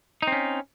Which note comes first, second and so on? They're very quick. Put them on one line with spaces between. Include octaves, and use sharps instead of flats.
D#4 C4 C#4